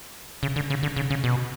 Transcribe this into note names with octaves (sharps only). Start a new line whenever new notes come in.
C#3
D3
C#3
D3
C#3
C#3
B2